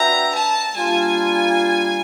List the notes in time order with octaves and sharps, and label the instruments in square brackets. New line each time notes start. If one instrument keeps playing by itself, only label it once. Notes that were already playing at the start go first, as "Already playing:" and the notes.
Already playing: [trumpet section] D4 F#4 B4 E5 G5 [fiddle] A#5
[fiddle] A5
[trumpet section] G3 A#3 D4 F4 [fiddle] G#5